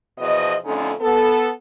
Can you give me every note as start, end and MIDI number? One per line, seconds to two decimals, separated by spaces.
0.19 0.54 40
0.19 0.54 47
0.19 0.54 53
0.19 0.54 75
0.66 0.92 41
0.66 0.92 50
0.66 0.92 57
0.66 0.92 60
0.66 0.92 61
0.66 0.92 63
1.01 1.50 59
1.01 1.50 69